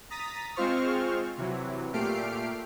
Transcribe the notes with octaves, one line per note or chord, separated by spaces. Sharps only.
A#5 D#6 A6 B6
G#3 C4 F4 C5 C#6 F6
C3 E3 F#3
A#2 A3 G4 F6 C7 D7